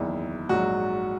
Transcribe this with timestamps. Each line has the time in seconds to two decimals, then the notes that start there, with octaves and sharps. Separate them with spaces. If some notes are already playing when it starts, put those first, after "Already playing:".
Already playing: F#1 E2 D#3 E4
0.49 A#1 G#2 F#3 F#4